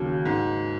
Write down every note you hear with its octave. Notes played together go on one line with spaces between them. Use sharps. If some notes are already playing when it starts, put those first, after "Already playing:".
Already playing: D#2 C#3 F#3
G#2